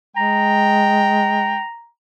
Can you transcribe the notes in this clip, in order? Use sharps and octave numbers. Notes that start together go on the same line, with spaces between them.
G#3 G5 A#5